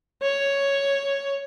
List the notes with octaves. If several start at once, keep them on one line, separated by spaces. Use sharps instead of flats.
C#5